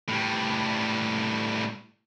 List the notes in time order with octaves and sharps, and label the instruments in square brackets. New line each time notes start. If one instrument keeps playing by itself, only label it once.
[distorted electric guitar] A2 G3